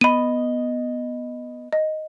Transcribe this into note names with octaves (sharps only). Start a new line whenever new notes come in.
B3 D#5 B5 D#7
D#5